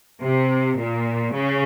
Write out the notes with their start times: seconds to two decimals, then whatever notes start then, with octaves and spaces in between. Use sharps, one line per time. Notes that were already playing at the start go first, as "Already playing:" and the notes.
0.22 C3
0.78 A#2
1.34 C#3